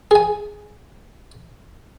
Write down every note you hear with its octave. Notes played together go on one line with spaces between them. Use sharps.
G#4 G#5